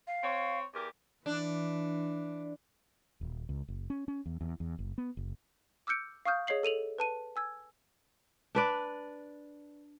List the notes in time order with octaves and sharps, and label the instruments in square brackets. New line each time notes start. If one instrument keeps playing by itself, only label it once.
[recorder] F5
[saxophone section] C4 C#5
E2 G4 A#4
[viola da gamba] E3 [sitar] D4
[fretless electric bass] D#1
C#2
F#1
C#4
C#4
E2
E2
E2
F#1
B3
F#1
[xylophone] D6 E6 F6 G6 C#7 D7
F5 C#6 D#6 F6 G6
G#4 C#5 D#5 C7 F#7
A4 D#7 F7 F#7
B4 A5 D#7
G#5 E6 G#6
[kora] D4 B4 D5